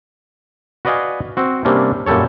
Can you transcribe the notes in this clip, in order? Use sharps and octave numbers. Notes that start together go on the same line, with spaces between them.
F#4 B4 D5 D#5 F5 G#5
C4 F#4
C3 G3 A#3 C#4 D4
F#2 A#2 G3 A4 C#5